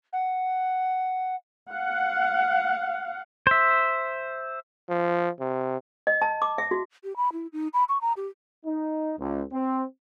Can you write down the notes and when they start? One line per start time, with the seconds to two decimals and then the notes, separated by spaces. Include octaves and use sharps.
0.13 F#5
1.71 F5 F#5
3.47 C5 E5
4.89 F3
5.40 C3
6.07 D#5
6.22 A5
6.42 D6
6.58 E5
6.71 F#4
7.04 G4
7.17 B5
7.33 E4
7.53 D#4
7.73 B5
7.89 C#6
8.01 A#5
8.17 G4
8.65 D#4
9.18 C#2
9.53 C4